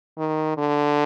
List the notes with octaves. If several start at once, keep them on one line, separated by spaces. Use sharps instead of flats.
D#3
D3